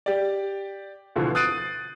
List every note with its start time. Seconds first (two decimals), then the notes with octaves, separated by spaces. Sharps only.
0.06 G4 D5
1.16 D2 B2 D3 E3 F3
1.35 D#6 F#6 A6 C7 D7 D#7